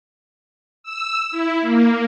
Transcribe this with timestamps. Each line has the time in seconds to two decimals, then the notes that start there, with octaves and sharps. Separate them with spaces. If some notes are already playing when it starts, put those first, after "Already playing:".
0.84 E6
1.31 E4
1.61 A#3